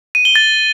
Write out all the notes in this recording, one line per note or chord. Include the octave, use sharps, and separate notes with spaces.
D#7
G7
A6